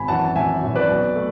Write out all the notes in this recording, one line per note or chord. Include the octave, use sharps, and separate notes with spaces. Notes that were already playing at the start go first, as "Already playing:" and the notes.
Already playing: G#1 G#5 B5
F#2 E3 F#5 A5
A5
G#1 E5 G#5
F#2 E3
B4 D5
B1
A3